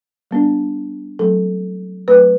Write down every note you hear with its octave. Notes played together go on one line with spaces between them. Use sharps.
G3 B3 D4
F#3 A3 C4 A4
F#3 A3 C4 B4